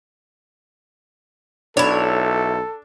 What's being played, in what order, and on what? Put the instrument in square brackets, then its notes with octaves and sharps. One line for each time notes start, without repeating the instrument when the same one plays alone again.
[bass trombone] B1 [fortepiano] D4 [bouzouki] E4 C#5 [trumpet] A4